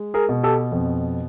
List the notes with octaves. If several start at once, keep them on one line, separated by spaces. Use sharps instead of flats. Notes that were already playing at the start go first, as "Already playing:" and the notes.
Already playing: G#3
G#4 A#4
B2
G4 A4
F2